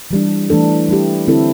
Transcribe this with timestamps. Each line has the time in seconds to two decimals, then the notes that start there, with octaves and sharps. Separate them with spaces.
0.11 E3 G3 D4
0.50 E3 A3 D4 A4
0.89 G3 E4 G4
1.28 D3 C4 E4 A4